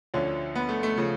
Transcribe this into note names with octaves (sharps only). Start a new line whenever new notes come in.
D2 D3 F3 C#4
B3
A3
A3
C#3 F3